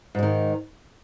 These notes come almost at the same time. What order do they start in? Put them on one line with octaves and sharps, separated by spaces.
G#2 G#3 D#3